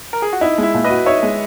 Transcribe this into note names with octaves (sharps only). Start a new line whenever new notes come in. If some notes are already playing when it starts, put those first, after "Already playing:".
A#4
G#4
F#4
D#4 E4
G#3 E4
A#2
B4 D#5
F#4
D#4 C#5 E5
G#3